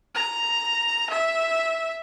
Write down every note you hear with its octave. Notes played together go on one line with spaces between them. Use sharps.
A#5
E5